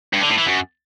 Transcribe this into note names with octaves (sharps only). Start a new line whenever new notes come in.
G2
D3
A2
E3
F#2